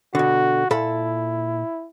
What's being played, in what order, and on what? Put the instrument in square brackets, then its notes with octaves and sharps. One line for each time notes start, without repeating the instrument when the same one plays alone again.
[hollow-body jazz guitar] B2 D3 [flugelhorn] F#4
[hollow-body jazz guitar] A#2 A4 B5 [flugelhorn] E4